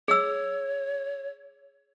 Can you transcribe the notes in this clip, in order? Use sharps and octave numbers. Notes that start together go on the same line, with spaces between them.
G#4 C#5 E6